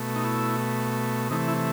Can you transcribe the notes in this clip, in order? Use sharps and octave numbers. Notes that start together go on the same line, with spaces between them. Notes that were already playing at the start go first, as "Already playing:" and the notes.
Already playing: B2 A3
D#4
E4
C3 E3 A3 D#4
E4